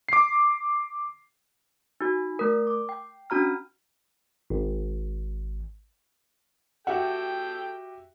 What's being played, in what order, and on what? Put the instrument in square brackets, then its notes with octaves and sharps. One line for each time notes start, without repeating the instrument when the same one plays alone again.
[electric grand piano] D6 C7
[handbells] D#4 F#4
A3 A#4
D6
G5
C#4 D4 F#4 A#5 F6
[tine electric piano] G#1
[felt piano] F#4 G4 E5 [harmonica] A4 G5 [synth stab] F#5